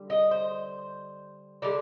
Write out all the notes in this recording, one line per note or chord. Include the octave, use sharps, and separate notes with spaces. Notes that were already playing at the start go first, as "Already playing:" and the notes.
Already playing: D3 G3
D#5
C5
D3 G3 D5